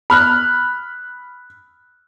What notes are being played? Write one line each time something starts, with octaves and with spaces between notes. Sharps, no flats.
B5 F6 F#6